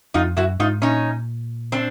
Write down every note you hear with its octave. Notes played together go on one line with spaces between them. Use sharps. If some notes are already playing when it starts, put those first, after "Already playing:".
F2 D#4 F4
F#2 E4 F#4
G#2 D#4 F4
A#2 C#4 D#4
C4 D4